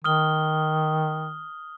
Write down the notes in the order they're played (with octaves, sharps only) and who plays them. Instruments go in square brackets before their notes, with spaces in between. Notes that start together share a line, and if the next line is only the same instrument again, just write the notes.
[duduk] D#3 [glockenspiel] D#6 F6 G7